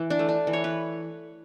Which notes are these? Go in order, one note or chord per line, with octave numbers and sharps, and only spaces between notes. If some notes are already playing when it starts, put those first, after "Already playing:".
Already playing: E3
D4
A3
D4
E3
C#5
B4